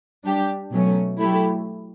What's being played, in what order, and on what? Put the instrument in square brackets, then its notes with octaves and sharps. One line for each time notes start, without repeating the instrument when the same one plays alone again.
[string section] G3 D4 G4
B2 F#3 A3 C#4
F#3 A3 E4 G4